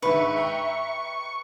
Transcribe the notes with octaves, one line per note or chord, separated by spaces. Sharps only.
G#2 D#3 D4 B4 E5 C#6
G5 A#5